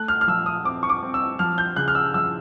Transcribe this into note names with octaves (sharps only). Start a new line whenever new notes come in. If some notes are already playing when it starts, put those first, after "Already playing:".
Already playing: A3 F#6
F6
F6
F3 E6
D#6
C4 D6
C#6
D6
C4
E6
F3 F6
G6
C#3 F#6
F6
E6
F3 E6